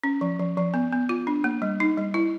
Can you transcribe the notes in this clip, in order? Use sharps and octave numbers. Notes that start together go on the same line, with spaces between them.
C#4
F3
F3
F3
B3
B3
F4
D4
A#3
G3
D#4
G3
E4